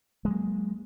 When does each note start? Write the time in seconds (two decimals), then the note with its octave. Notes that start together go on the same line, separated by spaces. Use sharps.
0.25 G#3
0.28 F#3
0.30 A#3